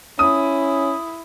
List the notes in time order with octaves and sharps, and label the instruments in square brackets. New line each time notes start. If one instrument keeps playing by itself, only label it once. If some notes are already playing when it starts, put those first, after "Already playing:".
[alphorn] C#4 [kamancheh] E4 [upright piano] D#6